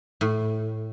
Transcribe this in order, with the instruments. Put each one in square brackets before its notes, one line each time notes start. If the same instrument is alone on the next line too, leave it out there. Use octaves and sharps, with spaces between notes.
[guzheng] A2